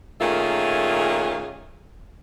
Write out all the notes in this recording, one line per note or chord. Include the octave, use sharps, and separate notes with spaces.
A#2 D#3 A3 C#4 F4 G#4